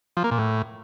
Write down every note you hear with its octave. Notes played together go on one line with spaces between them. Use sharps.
F3
A#3
A#2
A2